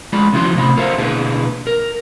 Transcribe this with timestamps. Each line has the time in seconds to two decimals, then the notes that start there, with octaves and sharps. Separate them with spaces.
0.13 G#3 F4 D5 B5
0.33 D#2 C#3 F3 E4 F#4 C6
0.55 A2 C3 D#5 B5
0.77 F4 A4 A#4 C5 E5 F5
0.98 B2 D3 A#3 E4 G#4 B4
1.67 A#4